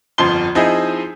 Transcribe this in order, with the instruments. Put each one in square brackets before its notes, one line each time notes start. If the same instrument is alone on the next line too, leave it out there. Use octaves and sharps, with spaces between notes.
[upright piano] G1 F2 F3 C6 G7
F3 C4 D#4 E4 G#4 D#5